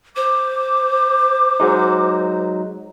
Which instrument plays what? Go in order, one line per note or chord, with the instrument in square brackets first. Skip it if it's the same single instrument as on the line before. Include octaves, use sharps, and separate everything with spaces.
[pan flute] C5 [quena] D6
[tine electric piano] F#3 G#3 D#4